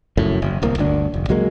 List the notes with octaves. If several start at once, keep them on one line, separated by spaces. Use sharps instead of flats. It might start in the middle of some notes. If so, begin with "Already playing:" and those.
F1 F#2 A2
F#1
D1 C2 A#3
G1 D2 D4
F1
C#2 F#3 G#3 A#3